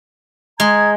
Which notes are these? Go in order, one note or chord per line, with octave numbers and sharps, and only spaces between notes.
G#3 A#5 D#6 G#6